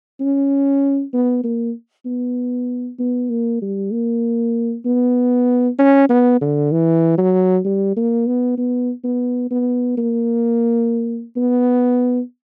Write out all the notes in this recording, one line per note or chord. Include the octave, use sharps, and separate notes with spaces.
C#4
B3
A#3
B3
B3
A#3
G3
A#3
B3
C#4
B3
D3
E3
F#3
G3
A#3
B3
B3
B3
B3
A#3
B3